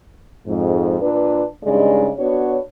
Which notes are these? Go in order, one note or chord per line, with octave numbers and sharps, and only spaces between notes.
F2 G#2
A#2 D4 B4
G2 C#3 G#3 D#4 D5
B3 D4 F#4 C#5